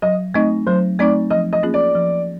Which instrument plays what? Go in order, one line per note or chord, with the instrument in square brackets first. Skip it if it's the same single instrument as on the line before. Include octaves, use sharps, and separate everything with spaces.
[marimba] F#3 [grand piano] D#5
[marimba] A3 C4 D#4 [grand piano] D#5
[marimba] F#3 [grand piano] C5
[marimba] A3 C4 D#4 [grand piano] D5
[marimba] F3 [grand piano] D#5
[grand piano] D#5
[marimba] A#3 C#4 F4 G#4
[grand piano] D5
[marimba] F3